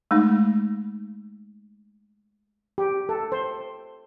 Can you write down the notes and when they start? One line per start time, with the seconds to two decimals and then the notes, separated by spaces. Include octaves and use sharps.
0.11 G#3 A3 D#4
2.78 G4
3.09 A4
3.32 C5